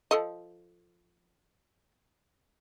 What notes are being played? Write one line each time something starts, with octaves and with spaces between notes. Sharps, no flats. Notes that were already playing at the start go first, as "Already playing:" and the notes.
F3 A4 D#5